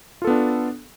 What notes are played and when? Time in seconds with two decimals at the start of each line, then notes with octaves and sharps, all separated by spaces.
0.22 F4
0.25 A4
0.27 B3
0.30 D4